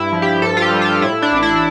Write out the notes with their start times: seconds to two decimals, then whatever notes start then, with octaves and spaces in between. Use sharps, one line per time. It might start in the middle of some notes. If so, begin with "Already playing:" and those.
Already playing: G2 E4
0.12 F3
0.22 G4
0.42 G2 A4
0.57 F4
0.62 G4
0.72 G3
0.82 F4
1.02 A2 E4
1.22 D4
1.32 A1
1.43 E4